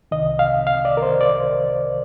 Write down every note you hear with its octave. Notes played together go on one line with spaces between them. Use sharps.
C2 C3 D#3 D#5
F5
F5
D5
A#4
C5
D5